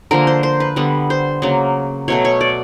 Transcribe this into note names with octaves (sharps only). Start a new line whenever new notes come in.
D3 F3 A#3 A#4
C5
C5
B4
D3 G3 B3
C5
C#3 F#3 A#3
B2 F#3 A3 C#5
C#5
D5